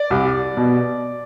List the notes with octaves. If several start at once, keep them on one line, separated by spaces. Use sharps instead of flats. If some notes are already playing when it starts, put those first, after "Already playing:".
Already playing: D5
C2
B2